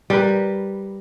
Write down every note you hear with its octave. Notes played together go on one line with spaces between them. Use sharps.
G3 A#4 B4